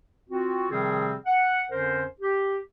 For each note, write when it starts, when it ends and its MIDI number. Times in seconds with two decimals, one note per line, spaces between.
0.29 0.68 60
0.29 0.68 65
0.29 0.68 66
0.71 1.13 48
0.71 1.13 51
0.71 1.13 53
0.71 1.13 55
0.71 1.13 60
0.71 1.13 68
1.26 1.64 78
1.71 2.04 41
1.71 2.04 50
1.71 2.04 61
1.71 2.04 70
1.71 2.04 72
2.20 2.57 67